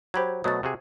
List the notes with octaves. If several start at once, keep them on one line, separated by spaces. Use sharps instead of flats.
F#3 G4 C5 B5 G#6
B2 F#3 A3 D#6 A6
C3 F#4 G#4